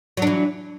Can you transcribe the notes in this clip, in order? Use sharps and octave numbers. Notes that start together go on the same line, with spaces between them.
E3 F#3 D4